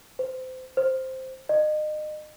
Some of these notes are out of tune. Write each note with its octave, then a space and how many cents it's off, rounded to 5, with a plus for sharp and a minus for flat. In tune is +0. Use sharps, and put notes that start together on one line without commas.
C5 -25
C5 +0
D#5 -30